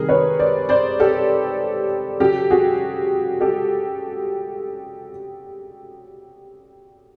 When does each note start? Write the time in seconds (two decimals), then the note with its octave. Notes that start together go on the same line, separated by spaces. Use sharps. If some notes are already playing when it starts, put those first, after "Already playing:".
Already playing: C3 D#3 G3 G#4 A#4
0.09 B4 C#5
0.39 C5 D5
0.69 C5 D5
1.00 G4 A4
2.20 C#3 F#3 G4 A4
2.50 F#4 G#4
3.41 G4 A4